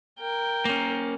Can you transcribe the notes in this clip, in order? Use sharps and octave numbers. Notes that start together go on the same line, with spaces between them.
A#4 G5
A#3 C#4